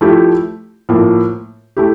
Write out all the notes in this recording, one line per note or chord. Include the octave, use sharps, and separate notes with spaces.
F3 A3 E4 G4
A2 F3 A#3
A3 E4 G4